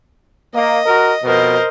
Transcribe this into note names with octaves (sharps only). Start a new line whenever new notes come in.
A#3 D#5
F#4 A#4
F2 B2 A#4 C5 D#5